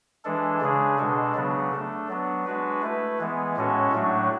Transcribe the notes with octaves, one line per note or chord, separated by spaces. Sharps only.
E3 G#3 D4 A4
C#3 G#3 D4 G#4
B2 G#3 D4 A4
C#3 F#3 B3 D4
A3 D4 A4
F#3 B3 D4
G#3 D4 F#4 B4
A3 E4 B4
E3 G#3 B3
A2 G#3 C#4 F#4 A4
A2 F#3 A3 D4 F#4